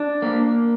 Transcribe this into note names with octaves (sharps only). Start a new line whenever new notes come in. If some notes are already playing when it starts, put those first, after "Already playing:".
Already playing: D4
A#3